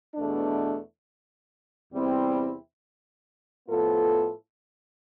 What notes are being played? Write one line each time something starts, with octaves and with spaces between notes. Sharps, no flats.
E2 B2 A3 D4
E2 C3 G3 C4 E4
A2 F3 B3 F4 A4